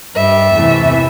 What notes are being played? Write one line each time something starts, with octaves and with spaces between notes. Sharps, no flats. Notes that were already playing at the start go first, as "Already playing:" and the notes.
G2 G3 E5
E2 C3 E3 A3